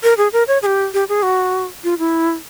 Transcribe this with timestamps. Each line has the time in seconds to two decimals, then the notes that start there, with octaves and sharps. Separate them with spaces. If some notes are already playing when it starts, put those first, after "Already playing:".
0.03 A#4
0.18 G#4
0.33 A#4
0.48 C#5
0.62 G#4
0.66 G4
0.94 G4
1.09 G#4
1.23 F#4
1.84 F4
1.99 E4